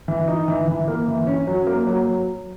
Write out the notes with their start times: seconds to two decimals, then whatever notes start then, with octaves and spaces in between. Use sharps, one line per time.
0.08 E3
0.28 D#4
0.48 E3
0.68 E3
0.88 A#3
1.08 E3
1.27 C#4
1.47 F#3
1.67 A#3
1.87 F#3
2.07 F#3